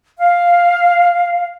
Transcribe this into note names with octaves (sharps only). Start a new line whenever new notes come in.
F5